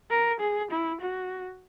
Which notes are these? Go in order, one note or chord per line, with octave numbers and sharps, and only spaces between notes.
A#4
G#4
E4
F#4